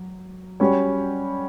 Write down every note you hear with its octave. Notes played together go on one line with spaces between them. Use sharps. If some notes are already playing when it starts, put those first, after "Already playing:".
Already playing: F#3
G3 C#4 F#4 C#5